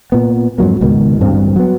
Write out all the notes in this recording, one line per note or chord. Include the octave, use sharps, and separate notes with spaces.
A#2 B3
F2 G#2 F#3 A#3
C#2 G#2 B2 D#3
A1 D2 G2 C4
F#3 B3